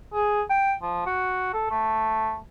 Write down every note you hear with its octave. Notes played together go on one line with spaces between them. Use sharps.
G#4
G5
F3
F#4
A4
A3